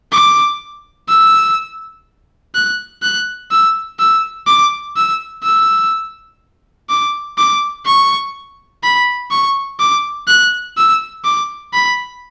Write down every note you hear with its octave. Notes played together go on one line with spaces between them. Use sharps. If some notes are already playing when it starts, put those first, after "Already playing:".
D6
E6
F#6
F#6
E6
E6
D6
E6
E6
D6
D6
C#6
B5
C#6
D6
F#6
E6
D6
B5